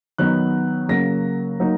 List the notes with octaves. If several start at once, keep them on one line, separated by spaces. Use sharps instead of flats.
D#3 F#3 B3 D#4 F#6
C#3 F#3 A#3 A#6
F#3 A#3 D#4